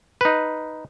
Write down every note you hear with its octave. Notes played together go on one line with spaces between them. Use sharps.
D#4 B4